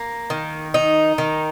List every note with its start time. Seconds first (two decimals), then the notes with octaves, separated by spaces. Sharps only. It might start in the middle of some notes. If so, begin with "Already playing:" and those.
Already playing: A#3
0.30 D#3
0.74 D#4
1.18 D#3